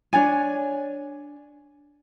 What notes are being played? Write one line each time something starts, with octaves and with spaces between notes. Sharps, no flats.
D4 C#5 D5 G#5